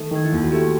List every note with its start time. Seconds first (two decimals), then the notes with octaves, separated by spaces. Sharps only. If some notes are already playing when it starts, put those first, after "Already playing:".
Already playing: D#3 A3 A4
0.11 D#3 D#4
0.25 E4
0.32 D#2 F4
0.43 F#4
0.52 A3 G4